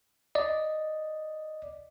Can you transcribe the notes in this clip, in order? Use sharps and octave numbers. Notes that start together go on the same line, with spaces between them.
D5 D#5